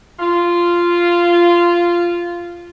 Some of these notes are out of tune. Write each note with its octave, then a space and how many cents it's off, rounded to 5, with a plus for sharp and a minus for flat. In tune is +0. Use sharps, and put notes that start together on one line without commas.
F4 -10